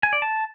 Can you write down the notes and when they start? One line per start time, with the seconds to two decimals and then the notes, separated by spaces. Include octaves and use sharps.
0.03 G#5
0.13 D5
0.22 A5